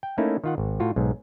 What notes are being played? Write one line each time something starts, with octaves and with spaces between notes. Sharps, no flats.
G5
A3 A#3 C#4 D#4 E4
D#3 F4 F#5
G#1
A2 F4 F#4
B1 G#2